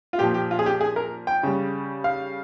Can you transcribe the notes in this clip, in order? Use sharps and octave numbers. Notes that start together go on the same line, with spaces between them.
F4
A#2 F3 G4
G4
F4
G#4
G4
G#4
A#4
G5
C#3 G3
F5